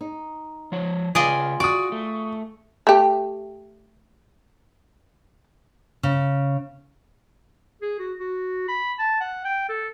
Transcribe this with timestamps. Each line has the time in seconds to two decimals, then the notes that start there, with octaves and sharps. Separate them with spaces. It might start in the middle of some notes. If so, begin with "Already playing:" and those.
0.01 D#4
0.72 F3 C#5
1.15 C#3 F4 G#4 B4 D5 D#5
1.60 F#4 D5 C#6 D#6
1.92 A3
2.87 A3 G4
6.03 C#3
7.82 G#4
7.99 F#4
8.19 F#4
8.68 B5
8.99 A5
9.20 F#5
9.44 G5
9.69 A4